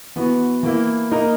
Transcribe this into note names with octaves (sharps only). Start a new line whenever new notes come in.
E3 B3 F#4
E3 A#3 E4
A#3 D#4 A#4